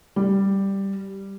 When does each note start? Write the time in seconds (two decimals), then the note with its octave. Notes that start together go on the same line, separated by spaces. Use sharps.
0.16 G3